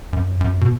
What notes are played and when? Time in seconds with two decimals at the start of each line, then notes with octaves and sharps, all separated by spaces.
0.13 F#2
0.41 F#2
0.61 B2